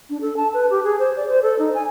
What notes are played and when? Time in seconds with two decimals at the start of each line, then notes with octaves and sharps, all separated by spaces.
0.10 D4
0.21 A4
0.37 A5
0.54 B4
0.70 G4
0.84 G#4
0.99 C5
1.16 D5
1.29 C5
1.43 A4
1.59 D#4
1.74 G#5